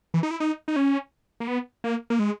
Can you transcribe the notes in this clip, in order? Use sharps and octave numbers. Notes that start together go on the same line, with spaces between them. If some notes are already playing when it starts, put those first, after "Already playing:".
E3
D#4
E4
D#4
D#4
C#4
A#3
B3
A#3
A#3
G#3